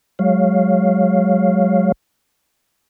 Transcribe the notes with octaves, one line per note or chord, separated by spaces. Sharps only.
F#3 G#3 C#5 F5